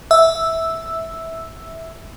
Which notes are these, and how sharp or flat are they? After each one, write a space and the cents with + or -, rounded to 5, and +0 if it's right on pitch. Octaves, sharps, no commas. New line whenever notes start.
E5 -10 E6 +0